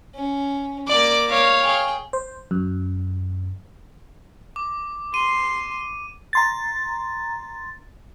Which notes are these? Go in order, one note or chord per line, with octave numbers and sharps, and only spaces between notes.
C#4
A#3 D5 D6
C#5 F5
G#4 G5
C5
F#2
D6
C6 D#7
A#5 C6 A6